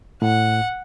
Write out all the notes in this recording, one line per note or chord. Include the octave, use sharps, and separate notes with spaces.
A2 F#5